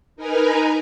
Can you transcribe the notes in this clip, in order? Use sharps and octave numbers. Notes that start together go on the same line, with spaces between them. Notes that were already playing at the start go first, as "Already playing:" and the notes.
D#4 A#4 B4 G#5 A#5